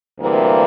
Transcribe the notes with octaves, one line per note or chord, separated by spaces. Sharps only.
D2 C3 E3 G3 A#3